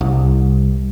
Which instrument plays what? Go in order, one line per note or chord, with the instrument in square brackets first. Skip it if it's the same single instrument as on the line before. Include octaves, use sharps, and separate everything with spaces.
[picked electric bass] C2